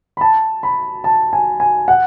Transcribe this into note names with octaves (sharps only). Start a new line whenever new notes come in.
B5
A5
B5
A5
G#5
G#5
F#5